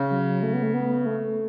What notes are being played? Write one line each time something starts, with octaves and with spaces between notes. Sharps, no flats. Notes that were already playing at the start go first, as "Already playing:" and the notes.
Already playing: C#3
F#3
A3
B3
A3
B3
A3